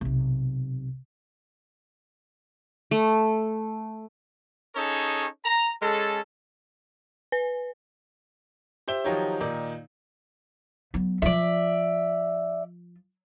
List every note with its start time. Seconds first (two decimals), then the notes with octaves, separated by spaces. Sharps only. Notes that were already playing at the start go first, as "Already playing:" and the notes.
0.01 B1 C3
2.91 A3
4.76 C#4 D#4 G#4 A4 C#5
5.45 A#5
5.82 G#3 C#4 A4
7.32 B4
8.88 G4 C5 E5 G7
9.04 D#3 F3 F#3 D#4 G4 C#5
9.40 A#2 D#3 D#4 D5
10.94 F#3 B3
11.22 F3 F4 D5 E5